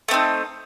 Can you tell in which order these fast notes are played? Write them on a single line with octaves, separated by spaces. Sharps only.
A3 C4 D#4